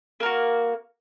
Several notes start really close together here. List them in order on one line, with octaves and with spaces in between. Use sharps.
A#3 A#4 F#4